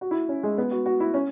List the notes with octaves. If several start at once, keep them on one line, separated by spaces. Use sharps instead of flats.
F#4
E4
C#4
G#3
B3
F#4
F#4
E4
C#4